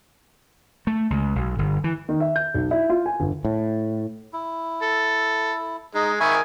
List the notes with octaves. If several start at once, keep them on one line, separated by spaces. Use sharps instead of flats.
A3
C#2
B1
G1
E3
D#3
E5
G6
B1
E4
F4
G#5
G1
A2
E4
A4
G#3 D#4
D#3 A#4 E5 G#5 B5 C#6